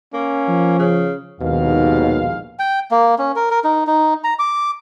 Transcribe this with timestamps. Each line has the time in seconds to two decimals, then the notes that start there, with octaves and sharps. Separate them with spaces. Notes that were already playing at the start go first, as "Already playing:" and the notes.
0.14 A#3 C#4
0.48 F3
0.79 C#3
1.41 A#1 D#2 G#2 B2 F5
2.59 G5
2.91 A#3
3.19 C#4
3.36 A#4
3.51 A#4
3.64 D#4
3.87 D#4
4.24 A#5
4.39 D6